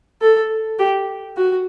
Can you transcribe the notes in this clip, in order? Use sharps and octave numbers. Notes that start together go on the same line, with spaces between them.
A4
G4
F#4